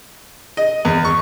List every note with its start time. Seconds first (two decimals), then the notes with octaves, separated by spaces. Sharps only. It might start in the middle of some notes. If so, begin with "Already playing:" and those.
0.57 D#5
0.85 E2
1.05 C#6